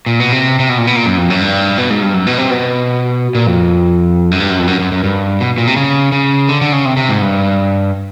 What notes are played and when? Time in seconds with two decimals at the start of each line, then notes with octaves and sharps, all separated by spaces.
0.06 A#2
0.20 B2
0.33 C3
0.59 C3
0.69 B2
0.78 A#2
0.87 B2
0.96 A#2
1.06 F#2
1.18 F2
1.30 F#2
1.41 G2
1.78 B2
1.90 G#2
2.02 G2
2.14 F#2
2.27 B2
2.38 C3
2.51 B2
3.35 A#2
3.47 F2
4.31 F#2
4.40 G2
4.50 F#2
4.59 F2
4.68 F#2
4.80 F#2
4.92 F#2
5.04 G2
5.40 B2
5.58 A#2
5.67 C3
5.76 C#3
6.12 C#3
6.49 D3
6.61 D3
6.73 C#3
6.85 C3
6.97 C3
7.09 G#2
7.22 G2